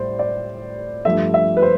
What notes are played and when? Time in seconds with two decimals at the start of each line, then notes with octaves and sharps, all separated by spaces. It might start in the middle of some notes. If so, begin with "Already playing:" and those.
Already playing: A2 G3 C5 D5
0.19 D5
1.05 G2 F3 A3 E5
1.34 E5
1.57 B4
1.62 C5